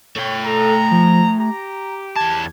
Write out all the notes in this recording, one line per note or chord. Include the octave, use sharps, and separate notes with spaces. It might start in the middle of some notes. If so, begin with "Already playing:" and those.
A3 C#5 G5
A4 A#5
F3
G4 A#5
E2 A5 G#6